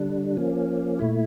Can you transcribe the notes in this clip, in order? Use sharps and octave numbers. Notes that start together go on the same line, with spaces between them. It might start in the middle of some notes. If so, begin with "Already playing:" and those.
Already playing: D3 G3 D4
F3 A#3 C#4
A#2 A3 E4